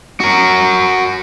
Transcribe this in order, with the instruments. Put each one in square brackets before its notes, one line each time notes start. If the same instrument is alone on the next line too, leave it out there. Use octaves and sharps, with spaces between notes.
[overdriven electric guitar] F#4 A#4